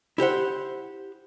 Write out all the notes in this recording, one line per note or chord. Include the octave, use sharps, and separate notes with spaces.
E4 G4 C5 F#5